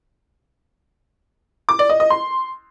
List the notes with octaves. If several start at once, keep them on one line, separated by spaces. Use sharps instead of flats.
D6
D5
D#5
D#5
C6